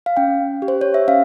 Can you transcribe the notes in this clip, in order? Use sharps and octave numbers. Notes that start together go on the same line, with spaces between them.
F5
C#4 G5
G4
C5
C#5
E5
C#4 F5